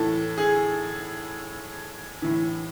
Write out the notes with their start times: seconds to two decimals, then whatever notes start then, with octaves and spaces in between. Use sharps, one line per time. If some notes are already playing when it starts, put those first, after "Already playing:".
Already playing: A2 E3 A4
0.38 G#4
2.22 A2 E3